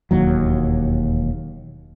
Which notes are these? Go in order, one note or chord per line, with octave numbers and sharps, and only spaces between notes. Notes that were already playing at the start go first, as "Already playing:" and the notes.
E1 D#2 F#3